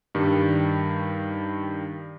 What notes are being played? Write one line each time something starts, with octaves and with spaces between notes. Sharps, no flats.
G2 D#3 G3